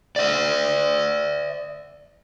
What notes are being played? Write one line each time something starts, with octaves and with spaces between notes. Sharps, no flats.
D5 E5